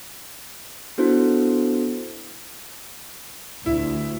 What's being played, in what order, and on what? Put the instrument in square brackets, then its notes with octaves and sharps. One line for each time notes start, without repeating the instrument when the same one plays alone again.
[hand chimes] B3 D4 E4 F#4 A4 C5
[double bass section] D2 [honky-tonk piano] E4